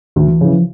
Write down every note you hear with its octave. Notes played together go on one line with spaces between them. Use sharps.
D2 D#3
E3
C#3 E3 F3
F3